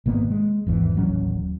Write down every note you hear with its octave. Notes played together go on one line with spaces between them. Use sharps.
G#1 C3 A#3 B3
G#3
G#1 E2 E3
D#1 A1 F#3 C#4